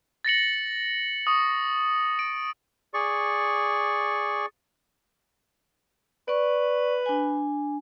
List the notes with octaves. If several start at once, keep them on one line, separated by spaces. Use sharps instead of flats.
A6 A#6 C#7 F#7
C#6 D#6
D7
G#4 D5 C#6
B4 D5 C#6
D4 G#5